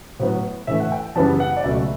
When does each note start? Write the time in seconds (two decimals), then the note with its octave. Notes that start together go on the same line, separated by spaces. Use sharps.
0.20 A2 F#3 B3
0.67 A2 E3 A3 E5
0.80 F#5
0.92 G5
1.15 F#2 C#3 E3 G3 B3 A5
1.40 F#5
1.56 D5
1.64 C#2 B2 F#3 A3 E5